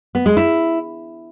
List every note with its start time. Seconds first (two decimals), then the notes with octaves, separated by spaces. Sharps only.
0.15 B3
0.26 G#3
0.37 E4